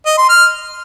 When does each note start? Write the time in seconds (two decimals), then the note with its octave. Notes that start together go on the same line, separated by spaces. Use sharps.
0.06 D#5
0.18 C6
0.29 F6